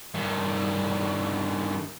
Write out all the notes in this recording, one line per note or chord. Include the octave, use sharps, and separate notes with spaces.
G2 D#3